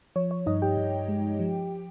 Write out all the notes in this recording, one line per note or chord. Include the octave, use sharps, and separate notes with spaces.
F3 C#5
C#5
G2 D#4 D#5
G4 G5
G2
G#3
F3